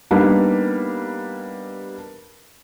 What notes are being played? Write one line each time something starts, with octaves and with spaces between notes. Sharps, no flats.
G3 A#3 B3 D4 D#4